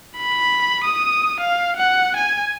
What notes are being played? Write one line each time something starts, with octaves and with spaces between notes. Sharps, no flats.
B5
D#6
F5
F#5
G#5